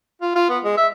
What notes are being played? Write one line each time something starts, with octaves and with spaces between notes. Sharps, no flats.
F4
F4
B3
G#3
E5